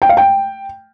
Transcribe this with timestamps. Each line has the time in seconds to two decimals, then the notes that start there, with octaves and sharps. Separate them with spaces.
0.02 G5
0.09 F5
0.17 G5